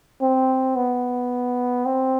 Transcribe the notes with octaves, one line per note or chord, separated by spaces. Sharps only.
C4
B3
C4